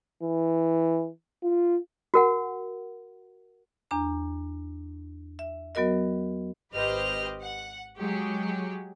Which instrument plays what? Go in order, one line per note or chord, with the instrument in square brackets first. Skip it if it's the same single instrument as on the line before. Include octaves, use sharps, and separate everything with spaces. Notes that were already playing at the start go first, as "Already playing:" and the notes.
[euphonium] E3
F4
[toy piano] F#4 A#4 F#5
[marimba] E2 D4 A#5
E5
F#3 B3 F#4 A#4 D#5
[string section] G#1 G4 B4 C5 D#5 F6
F#5
F#3 G#3 G4